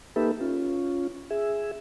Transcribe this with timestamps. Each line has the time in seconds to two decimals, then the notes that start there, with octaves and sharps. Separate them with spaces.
0.16 A#3 D#4 G4 A4 B4 E5
0.41 C#4 F4
1.30 G#4 E5